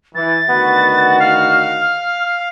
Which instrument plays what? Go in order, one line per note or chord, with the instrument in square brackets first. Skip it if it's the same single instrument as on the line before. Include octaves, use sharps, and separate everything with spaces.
[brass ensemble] E3 [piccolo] A6
[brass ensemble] D2 D#3 F#4 [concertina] B3
[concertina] F5 [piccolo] F6
[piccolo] F6